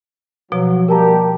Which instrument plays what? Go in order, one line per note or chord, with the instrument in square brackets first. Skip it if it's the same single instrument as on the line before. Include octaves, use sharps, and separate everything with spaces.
[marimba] B2 F3 [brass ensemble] F#3
[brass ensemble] G3 A#3 G4 [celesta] A#4 A5 A#5